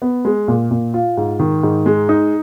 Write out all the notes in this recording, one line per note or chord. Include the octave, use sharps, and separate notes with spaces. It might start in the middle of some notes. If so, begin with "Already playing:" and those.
B3
G#3
A#2
A#2
F4
G#2
D#3
G#2
G#3
D#4